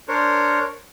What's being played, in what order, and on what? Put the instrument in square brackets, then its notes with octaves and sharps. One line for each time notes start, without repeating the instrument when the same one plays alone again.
[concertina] D4 A#4 C5 C#5